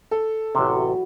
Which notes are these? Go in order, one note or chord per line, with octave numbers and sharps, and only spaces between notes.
A4
A1 C3 E3 F#3